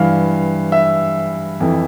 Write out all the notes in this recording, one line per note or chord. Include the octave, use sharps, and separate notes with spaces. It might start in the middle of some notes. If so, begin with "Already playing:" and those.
Already playing: G2 E3 F5
E5
F2 E3